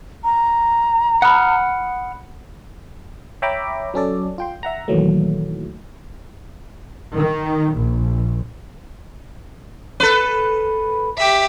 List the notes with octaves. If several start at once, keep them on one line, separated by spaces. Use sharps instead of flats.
A#5
F#5 B5 D#6 F6 F#6
C#5 E5 G5 A#5 B5 D6
F#3 C#4 A4 D5
F4 G5 C6
E5 F#5 A#5
A#2 D#3 E3 F#3 A3
D#3
A#1
A4 B4
G4 E5